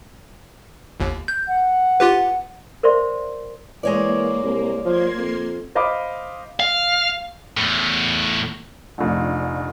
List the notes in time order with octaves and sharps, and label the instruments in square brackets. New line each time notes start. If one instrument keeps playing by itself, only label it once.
[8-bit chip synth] G1 D#2
G6
[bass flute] F#5
[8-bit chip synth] F4 G4 B4
[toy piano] A#4 C5 D5 E5 C6
[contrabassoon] E3 [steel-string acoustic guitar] G#3 C#5 D5 [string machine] A#3
[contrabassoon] C2
[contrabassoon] F3 [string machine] A#3 C6 G#6
[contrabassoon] F2
[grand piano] C5 D#5 F5 B5 D6
[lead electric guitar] F5
[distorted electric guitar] E2 A2
[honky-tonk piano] F1 A#1